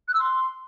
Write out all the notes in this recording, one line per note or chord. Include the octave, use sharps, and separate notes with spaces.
F#6
E6
C6